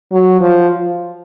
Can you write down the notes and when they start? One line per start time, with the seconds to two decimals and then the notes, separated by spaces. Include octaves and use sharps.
0.12 F#3
0.41 F3